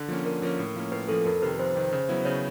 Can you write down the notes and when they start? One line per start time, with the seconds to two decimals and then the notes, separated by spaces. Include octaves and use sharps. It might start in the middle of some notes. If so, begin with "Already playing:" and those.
Already playing: D3
0.08 F3 A#3 C#4
0.25 D3 A#4
0.42 F3 A#3 C#4
0.59 A2
0.75 F3 A#3 C#4
0.92 A2 B4
1.08 F3 A#3 C#4 A4
1.25 F2 A#4
1.42 C3 D#3 B4
1.59 F2 C5
1.75 C3 D#3
1.93 C#3
2.09 F#3 B3 E4
2.25 C#3 C#5